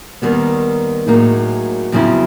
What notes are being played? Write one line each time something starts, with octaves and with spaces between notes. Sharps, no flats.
D#2 D#3 G3 B3
A2 F#3 A#3 D#4 G#4
F2 C#3 F#3 B3 E4